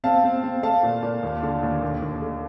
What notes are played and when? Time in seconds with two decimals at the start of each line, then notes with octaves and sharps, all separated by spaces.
0.04 C4 F5 A5
0.24 C4
0.43 C4
0.63 A3 F5 A5
0.83 A#2
1.03 A#2
1.23 D#2
1.43 D3
1.63 D#2
1.82 D#2
2.02 D#2
2.22 A3